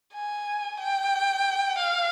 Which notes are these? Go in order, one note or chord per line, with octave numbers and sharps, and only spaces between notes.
G#5
G5
F5